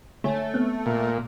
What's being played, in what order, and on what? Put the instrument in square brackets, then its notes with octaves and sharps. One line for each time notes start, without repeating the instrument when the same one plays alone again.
[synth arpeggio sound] D3 C#5 G#5 [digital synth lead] A3
[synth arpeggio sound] B3 C4
[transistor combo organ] A#2